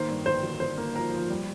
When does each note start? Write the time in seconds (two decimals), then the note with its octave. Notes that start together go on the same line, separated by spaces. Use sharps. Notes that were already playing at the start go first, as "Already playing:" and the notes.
Already playing: D#3 A#3 C5
0.08 G2
0.26 G1 C5
0.43 G1
0.60 G1 C5
0.78 A#3
0.95 F3 A#4
1.12 F3
1.30 G3